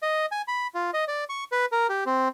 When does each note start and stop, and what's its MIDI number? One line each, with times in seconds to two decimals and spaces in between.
0.03 0.26 75
0.32 0.42 80
0.48 0.67 83
0.75 0.90 65
0.94 1.05 75
1.08 1.24 74
1.29 1.44 85
1.52 1.65 71
1.72 1.87 70
1.89 2.04 67
2.06 2.28 60